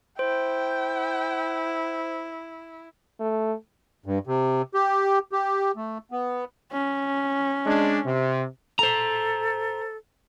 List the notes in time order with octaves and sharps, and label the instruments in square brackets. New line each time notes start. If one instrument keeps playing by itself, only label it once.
[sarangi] E4 [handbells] C5 [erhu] G5
[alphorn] A3
[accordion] G2
C3
G4
G4
A3
B3
[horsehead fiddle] C#4
[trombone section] G#3 D4
C3
[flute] A4 [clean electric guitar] C5 A#5